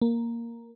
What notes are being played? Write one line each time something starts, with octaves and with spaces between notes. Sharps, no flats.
A#3